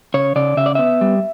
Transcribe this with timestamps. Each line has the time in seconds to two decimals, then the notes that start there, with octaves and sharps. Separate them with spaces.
0.14 C#3 C#5
0.36 C#3 D5
0.57 C#3 E5
0.66 D5
0.75 B3 E5
1.01 G3